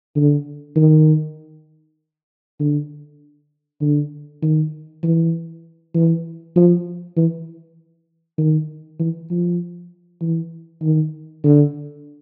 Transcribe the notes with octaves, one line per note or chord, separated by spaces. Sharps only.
D3
D#3
D3
D3
D#3
E3
E3
F3
E3
D#3
E3
F3
E3
D#3
D3